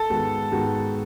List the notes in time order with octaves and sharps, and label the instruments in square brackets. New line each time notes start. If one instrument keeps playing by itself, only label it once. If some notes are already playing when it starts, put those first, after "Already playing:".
Already playing: [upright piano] A4
[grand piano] G#2 D#3 G#3 B3 F#4
G#2 D#3 G#3 B3 F#4